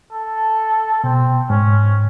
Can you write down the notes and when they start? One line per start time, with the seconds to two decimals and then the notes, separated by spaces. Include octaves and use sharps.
0.13 A4
1.04 B2 C4
1.50 G#2 C#4